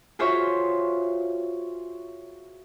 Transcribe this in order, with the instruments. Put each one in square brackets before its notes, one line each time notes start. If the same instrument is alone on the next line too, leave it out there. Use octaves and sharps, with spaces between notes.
[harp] F4 F#4 G#4 C5 C#5 E5